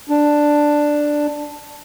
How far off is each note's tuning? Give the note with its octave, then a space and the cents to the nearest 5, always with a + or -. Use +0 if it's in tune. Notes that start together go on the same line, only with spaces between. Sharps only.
D4 +5